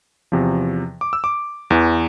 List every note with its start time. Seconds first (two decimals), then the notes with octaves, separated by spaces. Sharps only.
0.32 E2 C3 F3
1.01 D6
1.13 E6
1.24 D6
1.70 E2 E3